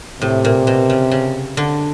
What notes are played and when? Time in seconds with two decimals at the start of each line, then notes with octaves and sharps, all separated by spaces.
0.21 A2 C3
0.45 A#2
0.67 B2
0.90 C#3
1.11 C#3
1.57 D3